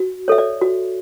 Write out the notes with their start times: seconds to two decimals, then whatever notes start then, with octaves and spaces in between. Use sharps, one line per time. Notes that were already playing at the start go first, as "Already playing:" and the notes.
Already playing: F#4
0.28 A4 C#5 E5
0.38 D5
0.61 F#4